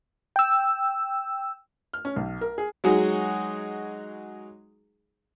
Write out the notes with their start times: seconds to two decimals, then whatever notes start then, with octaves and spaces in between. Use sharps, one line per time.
0.36 G5 E6
1.93 F6
2.05 C#4
2.16 B1
2.41 A#4
2.58 G#4
2.84 F#3 G#3 D#4 F#4 G#4